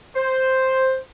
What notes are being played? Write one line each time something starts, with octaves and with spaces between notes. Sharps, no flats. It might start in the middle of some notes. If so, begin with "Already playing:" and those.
C5